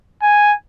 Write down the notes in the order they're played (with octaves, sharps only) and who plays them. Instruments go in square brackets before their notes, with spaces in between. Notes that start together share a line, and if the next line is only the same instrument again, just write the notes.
[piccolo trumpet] G#5